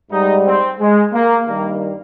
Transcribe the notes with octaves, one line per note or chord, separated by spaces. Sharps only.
G#2 G3 D#4
C4
G#3
A#3
G2 D#3 G3 A#3